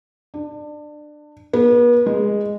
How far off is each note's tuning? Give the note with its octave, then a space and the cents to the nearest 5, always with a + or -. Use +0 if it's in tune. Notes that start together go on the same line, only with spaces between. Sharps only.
D4 +25
B3 -40
G#3 -10